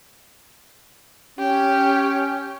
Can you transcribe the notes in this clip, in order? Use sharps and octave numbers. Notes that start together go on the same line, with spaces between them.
C#4 G4